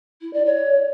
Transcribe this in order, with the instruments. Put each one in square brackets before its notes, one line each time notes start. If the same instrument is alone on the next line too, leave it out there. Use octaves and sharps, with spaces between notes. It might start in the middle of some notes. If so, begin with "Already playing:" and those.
[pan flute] E4
D5
C#5